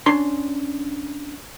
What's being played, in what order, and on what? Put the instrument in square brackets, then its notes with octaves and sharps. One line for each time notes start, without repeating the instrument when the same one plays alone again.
[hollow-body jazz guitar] C#4 D4 C6